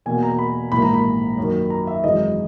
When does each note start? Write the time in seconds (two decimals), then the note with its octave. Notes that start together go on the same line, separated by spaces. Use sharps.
0.06 E2 B2 A#3 G#5
0.23 A#5
0.39 B5
0.72 A#1 G#2 E3 A#3 B5
0.82 A#5
0.94 B5
1.37 F#2 D#3 A#3
1.70 A#5
1.87 E5
2.04 G#1 F#2 E3 G#3 D#5